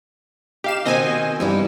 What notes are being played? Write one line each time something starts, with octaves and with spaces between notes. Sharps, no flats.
D#4 G4 F5 E7
B2 D#3 C4 D#5 G#5
G2 E3 G3 D#4 E4